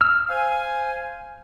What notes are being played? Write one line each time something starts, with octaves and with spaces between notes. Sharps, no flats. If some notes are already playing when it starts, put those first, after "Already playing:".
E6 F6
C5 F5 G#5